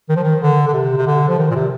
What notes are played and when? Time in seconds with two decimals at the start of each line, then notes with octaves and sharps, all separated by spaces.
0.09 D#3
0.16 F3
0.23 D#3
0.41 D3
0.68 D3
0.73 C3
0.97 C3
1.07 D3
1.28 F3
1.38 D#3
1.51 A#2
1.55 C3